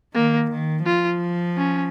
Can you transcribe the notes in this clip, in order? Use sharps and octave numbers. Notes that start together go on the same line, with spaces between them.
D#3 A#3
D#3
F3 F4
C#4